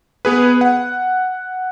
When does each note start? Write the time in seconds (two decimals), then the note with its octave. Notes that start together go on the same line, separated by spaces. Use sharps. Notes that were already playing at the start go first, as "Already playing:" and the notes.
0.25 B3 G#4 B4
0.61 F#5